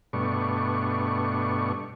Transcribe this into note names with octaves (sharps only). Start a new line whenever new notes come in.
G2 B2 A3 D4 C#6